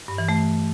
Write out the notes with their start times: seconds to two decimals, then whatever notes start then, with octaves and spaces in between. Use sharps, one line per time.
0.08 G2
0.18 E3
0.29 A3